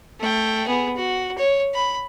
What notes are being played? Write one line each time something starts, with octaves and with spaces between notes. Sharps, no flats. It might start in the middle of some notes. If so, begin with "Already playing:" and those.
A3 G5
B3 G#4
F#4
C#5
B5